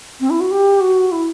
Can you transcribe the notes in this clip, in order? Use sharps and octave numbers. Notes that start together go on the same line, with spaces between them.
C4
E4
F#4
G4
F#4
E4